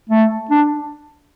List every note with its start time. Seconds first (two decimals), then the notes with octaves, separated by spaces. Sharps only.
0.09 A3
0.51 D4